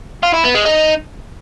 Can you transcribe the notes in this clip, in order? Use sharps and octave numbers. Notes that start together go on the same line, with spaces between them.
F4
E4
B3
G#3
D#4